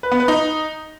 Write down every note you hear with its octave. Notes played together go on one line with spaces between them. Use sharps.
B4
B3
B4
D#4